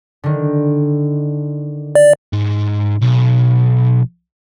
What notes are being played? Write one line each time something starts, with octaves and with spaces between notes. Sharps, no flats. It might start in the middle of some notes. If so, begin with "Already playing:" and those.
D3 D#3
D5
G#2
B1